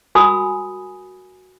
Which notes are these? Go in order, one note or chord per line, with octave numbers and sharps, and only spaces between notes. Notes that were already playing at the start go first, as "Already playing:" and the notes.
F#4 A#4 G#5 B5 D#6 E6